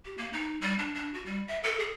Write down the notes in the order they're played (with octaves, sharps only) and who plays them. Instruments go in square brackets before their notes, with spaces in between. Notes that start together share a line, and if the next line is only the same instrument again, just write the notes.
[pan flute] G4
A#3
D#4
G3
D4
D4
F#4
G3
E5
A4
G#4